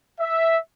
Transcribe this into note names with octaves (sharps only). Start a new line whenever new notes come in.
E5